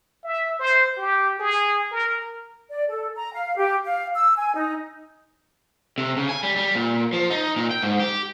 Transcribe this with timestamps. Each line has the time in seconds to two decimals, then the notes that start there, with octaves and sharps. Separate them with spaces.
0.24 E5
0.59 C5
0.97 G4
1.39 G#4
1.91 A#4
2.70 D5
2.90 A4
3.15 A#5
3.33 F5
3.57 G4
3.85 F5
4.15 E6
4.38 G#5
4.55 D#4
5.98 C3
6.17 C#3
6.29 G#5
6.43 G3
6.56 G3
6.75 A#2
7.13 F3
7.30 D#4
7.56 A#2
7.71 G5
7.83 G#2
8.00 G4